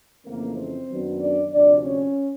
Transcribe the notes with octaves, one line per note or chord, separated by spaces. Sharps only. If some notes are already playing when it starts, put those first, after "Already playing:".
F2 C#3 E3 A3 A#3 C4 A#4
C4 C5
F#2 D#3 F#3 B3 D4
D4 D5
D2 C3 F3 D4 D5
C#4 C#5